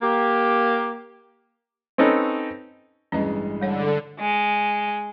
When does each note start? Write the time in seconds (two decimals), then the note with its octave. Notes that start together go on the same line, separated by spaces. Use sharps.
0.02 A#3 G4
1.98 C4 C#4 D#4 A4 B4 C#5
3.12 A1 G2 G#3 C#4 B4 D#5
3.61 D3 G3 C#5 F#5
4.20 G#3